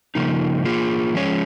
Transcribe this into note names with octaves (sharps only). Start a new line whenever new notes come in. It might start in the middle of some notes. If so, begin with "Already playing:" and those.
C#3 F3 A#3 D#4
A#3 F4 G#4
F3 G#3 C#4 G#4 C#5